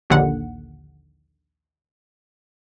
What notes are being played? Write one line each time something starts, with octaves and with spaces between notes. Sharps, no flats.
A#1 D#2 D3 F#5